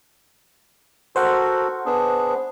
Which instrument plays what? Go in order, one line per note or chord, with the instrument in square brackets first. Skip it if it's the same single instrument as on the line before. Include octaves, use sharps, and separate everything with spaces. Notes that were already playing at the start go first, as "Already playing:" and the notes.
[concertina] F#4 A4 A#4 [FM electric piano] C5 F#5
[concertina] B3 D4 G#4